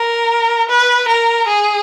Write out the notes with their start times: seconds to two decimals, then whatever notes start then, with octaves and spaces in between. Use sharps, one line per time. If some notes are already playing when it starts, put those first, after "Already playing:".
Already playing: A#4
0.70 B4
1.09 A#4
1.48 G#4